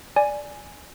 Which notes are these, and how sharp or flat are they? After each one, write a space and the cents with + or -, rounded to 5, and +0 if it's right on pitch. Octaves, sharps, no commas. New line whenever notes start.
D5 +0 G#5 +0